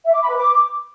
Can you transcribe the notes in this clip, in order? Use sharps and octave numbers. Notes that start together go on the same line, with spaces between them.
E5
D6
B5
B4
D6